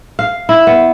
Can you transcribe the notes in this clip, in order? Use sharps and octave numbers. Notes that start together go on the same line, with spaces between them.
F5
E4
B3